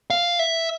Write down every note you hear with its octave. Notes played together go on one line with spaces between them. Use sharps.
F5
E5